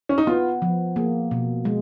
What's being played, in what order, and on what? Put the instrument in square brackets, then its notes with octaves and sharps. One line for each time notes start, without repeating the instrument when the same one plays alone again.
[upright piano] C#4
D#4
[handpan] B3 [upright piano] F4
[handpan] F3
[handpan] A#3 [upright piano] G#4
[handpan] B2
G#3